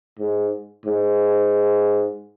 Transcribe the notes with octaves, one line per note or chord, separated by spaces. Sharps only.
G#2
G#2